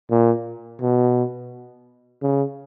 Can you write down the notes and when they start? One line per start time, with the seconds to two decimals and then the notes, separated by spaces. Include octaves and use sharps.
0.11 A#2
0.81 B2
2.22 C#3